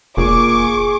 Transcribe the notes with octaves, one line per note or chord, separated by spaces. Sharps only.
F1 A#2 G#4 C#6 D6